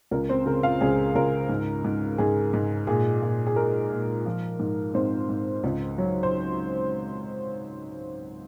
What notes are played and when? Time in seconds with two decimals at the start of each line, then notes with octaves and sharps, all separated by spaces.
0.11 C#2 A#4
0.29 C4 C5
0.46 C#3 A#4
0.63 F4 F5
0.81 C#2 G#4
1.15 C#2 A#4
1.49 G#2
1.84 G#2
2.18 G#2 G#4
2.54 G#2
2.87 A#2 G#4
3.22 A#2
3.47 G#4
3.56 G#3 A#4
3.92 A#2
4.26 F3
4.59 G#2
4.94 G#2 C4 C5
5.29 G#2
5.64 C#2
5.98 F#3
6.23 C5